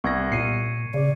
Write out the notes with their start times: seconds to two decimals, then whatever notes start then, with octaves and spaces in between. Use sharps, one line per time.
0.04 C2 B3 C#6 G#6 A#6
0.32 A#2 C7 C#7 D#7
0.94 C#3 D5